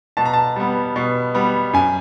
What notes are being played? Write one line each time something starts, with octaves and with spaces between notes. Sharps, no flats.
B2 A5
A#5
A5
G3 B3
B2
G3 B3
F#2 G#5